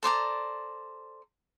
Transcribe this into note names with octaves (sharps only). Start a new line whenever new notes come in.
A4 C5 D5 A#5